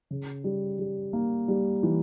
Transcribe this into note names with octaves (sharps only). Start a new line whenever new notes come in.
C#3
G3
G3
A#3
G3
E3